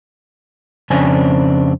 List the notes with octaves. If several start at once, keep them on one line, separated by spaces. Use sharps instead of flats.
F2 C#3 C4 D4 G#5